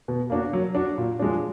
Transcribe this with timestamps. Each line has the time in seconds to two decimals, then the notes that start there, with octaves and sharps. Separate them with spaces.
0.08 B2
0.30 A#3 D4 F#4
0.53 F#3
0.75 D4 F#4
0.98 A#2
1.19 F3 G#3 D4